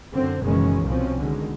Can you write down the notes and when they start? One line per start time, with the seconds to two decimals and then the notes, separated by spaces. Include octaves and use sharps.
0.11 F#2 D3 C4
0.40 F#1 B2 D#3 E3 G#3 C#4
0.85 C2 B2 F3 C4 C#4
1.18 B2 D3 D#3 G#3